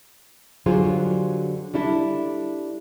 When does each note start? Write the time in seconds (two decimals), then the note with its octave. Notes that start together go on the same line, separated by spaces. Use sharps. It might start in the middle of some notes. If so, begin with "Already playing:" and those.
0.66 D3 F#3 G3 F4 G#4 C5
1.74 G3 D4 E4 A4